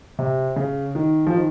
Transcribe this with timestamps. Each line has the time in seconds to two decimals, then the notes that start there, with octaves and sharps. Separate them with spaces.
0.19 C3
0.56 C#3
0.95 D#3
1.27 F3
1.33 D#3